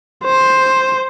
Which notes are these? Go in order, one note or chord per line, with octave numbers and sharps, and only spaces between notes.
C5